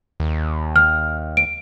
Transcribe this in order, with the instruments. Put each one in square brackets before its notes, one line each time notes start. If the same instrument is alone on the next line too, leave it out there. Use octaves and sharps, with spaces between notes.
[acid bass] D#2
[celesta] F6
D7